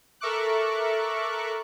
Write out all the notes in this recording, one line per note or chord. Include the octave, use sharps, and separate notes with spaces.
A4 A#4 E5 C#6 D6 F#6